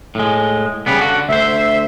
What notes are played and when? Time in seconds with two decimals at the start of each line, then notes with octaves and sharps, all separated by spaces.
0.15 A2 G#3
0.86 C#3 G3 B3
0.99 D3 F#4
1.29 D2 C5 E5